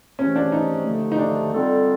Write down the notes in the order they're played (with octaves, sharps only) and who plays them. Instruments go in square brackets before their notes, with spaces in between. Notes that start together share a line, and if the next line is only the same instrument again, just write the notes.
[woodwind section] C3 E3 A3 [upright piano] C#4
[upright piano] D4
D#4
[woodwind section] D#2 D3 F3 A3
[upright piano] D#4
D4
[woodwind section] D3 G3 C4 F4 A4